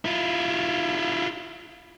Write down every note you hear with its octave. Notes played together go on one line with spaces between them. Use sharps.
E4 F4